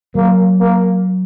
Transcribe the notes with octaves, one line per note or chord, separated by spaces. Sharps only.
F#3 A#3
A#3